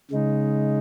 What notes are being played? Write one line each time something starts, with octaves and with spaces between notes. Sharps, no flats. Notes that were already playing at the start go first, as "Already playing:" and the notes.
C#3 G#3 D#4